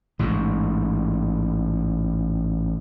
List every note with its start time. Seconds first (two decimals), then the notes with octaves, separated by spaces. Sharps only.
0.19 A1 G#2